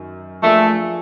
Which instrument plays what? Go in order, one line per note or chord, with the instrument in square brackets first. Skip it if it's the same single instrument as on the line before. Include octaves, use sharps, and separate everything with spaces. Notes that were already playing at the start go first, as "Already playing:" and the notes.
Already playing: [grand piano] F#2 D#3
[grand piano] F3 A#3 D4 F4 G#4 [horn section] A3